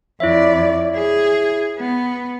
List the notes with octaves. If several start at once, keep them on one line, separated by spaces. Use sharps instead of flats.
F2 E4 C#5 D5 E5
G#4
B3